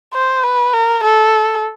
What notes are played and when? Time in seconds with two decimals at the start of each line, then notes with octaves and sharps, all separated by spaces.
0.14 C5
0.44 B4
0.73 A#4
1.04 A4